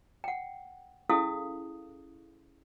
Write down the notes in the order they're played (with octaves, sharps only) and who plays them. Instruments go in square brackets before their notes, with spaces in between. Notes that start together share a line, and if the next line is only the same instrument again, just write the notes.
[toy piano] F#5 G5
C#4 E4 G#4 A4 F5 D#6